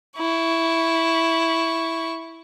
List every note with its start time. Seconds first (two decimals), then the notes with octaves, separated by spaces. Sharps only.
0.18 E4 C#6